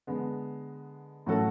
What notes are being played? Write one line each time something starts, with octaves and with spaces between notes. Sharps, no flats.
D3 G#3 B3
A2 F#3 C#4 F#4 A4